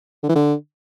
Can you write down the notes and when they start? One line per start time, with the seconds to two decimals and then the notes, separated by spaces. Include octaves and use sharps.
0.23 D3
0.29 E3
0.35 D3